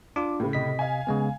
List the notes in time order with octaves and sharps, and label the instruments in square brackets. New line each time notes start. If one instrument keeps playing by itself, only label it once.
[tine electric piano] D4 F4 [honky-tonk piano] D6
[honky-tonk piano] A2 C#3
[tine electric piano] C3 D#5 B6
[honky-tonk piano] F5 G#5
[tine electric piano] C#3 G#3 B3